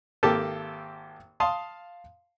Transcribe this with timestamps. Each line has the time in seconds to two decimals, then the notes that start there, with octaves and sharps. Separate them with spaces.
0.23 G#1 A#3 G4 A4 A5
1.40 F5 A5 C6 D#6